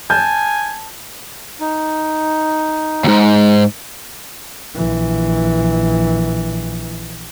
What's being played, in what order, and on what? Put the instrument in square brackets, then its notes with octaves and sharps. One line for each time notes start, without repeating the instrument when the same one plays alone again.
[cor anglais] G#5 [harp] A5 [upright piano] G6
[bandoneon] D#4
[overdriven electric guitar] D#2 G#2
[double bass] A#1 E3